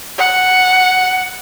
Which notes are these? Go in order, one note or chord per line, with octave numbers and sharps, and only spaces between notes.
F#5